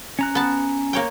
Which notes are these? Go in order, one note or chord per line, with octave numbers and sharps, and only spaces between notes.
C#4 A#5 F#6
B3 A5
A#3 C#5 G5